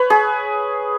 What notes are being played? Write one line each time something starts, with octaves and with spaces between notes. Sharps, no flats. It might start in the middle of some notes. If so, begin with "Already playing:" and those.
Already playing: B4 C#5
G#4